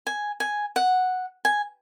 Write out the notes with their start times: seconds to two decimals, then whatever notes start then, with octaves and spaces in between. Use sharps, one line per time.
0.07 G#5
0.40 G#5
0.76 F#5
1.45 G#5